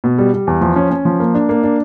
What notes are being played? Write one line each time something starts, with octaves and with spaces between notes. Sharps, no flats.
B2
G3
G3
E2
F3
C#4
C#4
F3
A#3
D4
A#3
D4